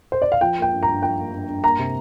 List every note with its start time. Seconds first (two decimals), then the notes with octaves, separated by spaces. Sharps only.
0.12 C5
0.22 D5
0.32 F5
0.41 F3 G5
0.57 A#3
0.62 G5
0.73 G2
0.83 A#5
0.88 G2
1.03 F3 G5
1.18 A#3
1.33 G2
1.48 G2
1.63 A#3 A#5
1.79 C3